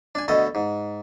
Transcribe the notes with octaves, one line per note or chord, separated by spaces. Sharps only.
D4 G#5
D2 B2 A4 D#5
G#2